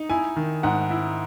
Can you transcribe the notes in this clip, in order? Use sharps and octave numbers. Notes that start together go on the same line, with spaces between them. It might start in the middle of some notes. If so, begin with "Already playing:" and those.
Already playing: D#4
E4 G#5
D#3
G#2 F#5
E4